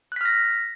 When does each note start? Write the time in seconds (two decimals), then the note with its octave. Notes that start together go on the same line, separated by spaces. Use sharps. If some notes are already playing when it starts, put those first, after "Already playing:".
0.12 F#6
0.16 B6
0.21 F6
0.25 A#6